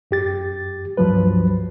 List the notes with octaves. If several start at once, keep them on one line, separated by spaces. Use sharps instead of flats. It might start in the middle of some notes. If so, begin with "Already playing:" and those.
F#2 G4 A6
C#2 G2 F3 F#3 B4